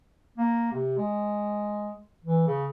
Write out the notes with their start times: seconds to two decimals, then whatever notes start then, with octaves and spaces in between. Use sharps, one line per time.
0.37 A#3
0.72 C3
0.97 G#3
2.24 E3
2.47 C#3